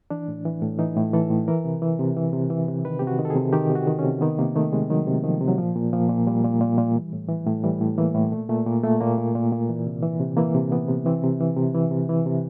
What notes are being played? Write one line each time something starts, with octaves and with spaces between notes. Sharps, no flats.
E3 D4
A2
E3
A2
E3 D#4
A2
E3 A4
A2
E3 A#4
C3
E3
C3
E3
C3
E3
C3
D#3 B4
C3 G4
F#4
D#3
A4
G#4
C3
D#3 G4
C3
F#4
D#3
C#4
C3
D#3 B3
C3 A#3
D#3 A3
C3 G#3
D#3 F#3
C3
D#3 F3
C3
F#3
A#2 F3
A#2
A#2 F3
A#2
A#2 G3
A#2
A#2
A#2
E3
A2
E3
A2
E3 G3
A2
E3 A#3
A2
A#2 A3
A#2 A3
A#2 A#3
A#2 A3
A#2 A#3
A#2
A#2
A#2
E3
C3
E3
C3
E3 A#3
C3
E3 B3
C3
E3 C4
C3
E3
C3
E3
C3
E3
C3